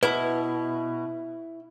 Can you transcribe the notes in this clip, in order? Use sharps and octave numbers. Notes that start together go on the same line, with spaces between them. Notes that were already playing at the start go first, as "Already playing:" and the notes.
B2 E4 B4